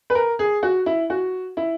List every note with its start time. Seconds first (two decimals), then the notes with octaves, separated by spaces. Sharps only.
0.10 B4
0.15 A#4
0.39 G#4
0.63 F#4
0.86 E4
1.10 F#4
1.57 E4